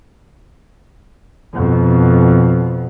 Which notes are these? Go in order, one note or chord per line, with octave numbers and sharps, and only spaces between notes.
F2 B2